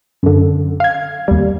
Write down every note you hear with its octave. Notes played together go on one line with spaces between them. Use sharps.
F#2 D3
F5 G#6
D#2 G3